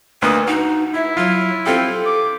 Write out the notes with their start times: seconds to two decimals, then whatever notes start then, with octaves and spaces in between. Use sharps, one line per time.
0.22 D2 A#3 B4 D#6
0.47 D#4 F#4
0.94 E4 E5
1.17 F#3 F4
1.66 C4 F4 G4 A4
2.06 D6